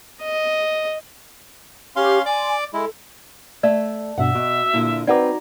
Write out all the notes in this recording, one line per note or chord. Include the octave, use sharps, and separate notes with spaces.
D#5
C#4 G4 F5 C6
D5 G#5 C6 D6
G#3 E4 A4
A3 D5 E5
G2 B2 D4 E5 F#5
B2 F#4
A#2 D3 E4
C4 D#4 F#4 B4 D5 F#5 A#5 D6